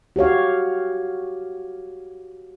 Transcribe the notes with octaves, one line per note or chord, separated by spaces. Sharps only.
F#4 G4 C#5 F5